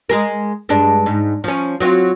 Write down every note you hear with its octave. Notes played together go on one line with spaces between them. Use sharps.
G#3 G#4 A#4
G2 G#3 D4
G#2
F3 C#4
F#3 C4 F4